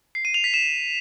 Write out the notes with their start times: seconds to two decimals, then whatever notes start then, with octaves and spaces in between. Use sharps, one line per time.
0.15 C7
0.25 D#7
0.34 F7
0.44 B6
0.54 E7